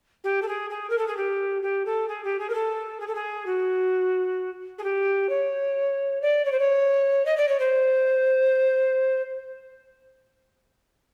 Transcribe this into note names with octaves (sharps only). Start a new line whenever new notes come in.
G4
A4
G#4
G#4
A#4
A4
G#4
G4
G4
A4
G#4
G4
G#4
A#4
A4
G#4
A4
G#4
F#4
G#4
G4
C#5
D5
C#5
C5
C#5
D#5
D5
C#5
C5